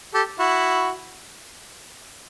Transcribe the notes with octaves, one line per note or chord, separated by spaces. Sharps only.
G4 A4
E4 F#4